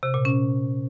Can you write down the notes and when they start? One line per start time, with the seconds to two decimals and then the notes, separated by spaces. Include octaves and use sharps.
0.03 C3
0.14 A#2
0.25 C#4